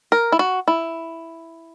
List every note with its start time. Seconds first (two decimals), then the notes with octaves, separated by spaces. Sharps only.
0.12 A#4
0.32 E4
0.39 F#4
0.68 E4